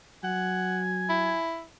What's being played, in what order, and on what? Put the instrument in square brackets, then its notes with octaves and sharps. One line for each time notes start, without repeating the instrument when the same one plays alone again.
[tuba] F#3 [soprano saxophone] F#5 [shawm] G#5
[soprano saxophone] E4